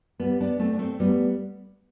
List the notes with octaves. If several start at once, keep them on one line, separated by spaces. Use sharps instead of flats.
G3 B3
B3 D4
A3 C4
D4
A3 C4
G3 B3